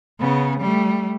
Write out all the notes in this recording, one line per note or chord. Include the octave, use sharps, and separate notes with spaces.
C#3 B3
G3 A3